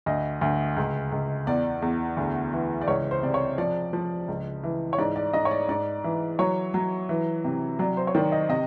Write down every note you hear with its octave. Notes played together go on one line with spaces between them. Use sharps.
D2 D#5
D2
C#2
C#2
E2 D5
E2
D2
E3
D5
C#2 C#5
C5
C3 D5
C#5
F3 D5
F3
C#2
E3
C#5
G#2 D5
D5
G#2 D#5
C#5
D5
G#2 D5
E3
F#3 C#5
F#3
E3
C3
F#3 D5
C5
C#5
D#3 D5
D#5
C3 D#5